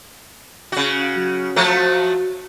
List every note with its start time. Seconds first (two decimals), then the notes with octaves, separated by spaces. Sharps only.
0.72 C#3 F#4
1.15 F#3
1.56 F3 F#3 A3 F#4